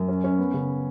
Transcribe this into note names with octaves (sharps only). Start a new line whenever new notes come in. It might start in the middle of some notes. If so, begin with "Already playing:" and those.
Already playing: F#2
C#4
C#4
B3
C#3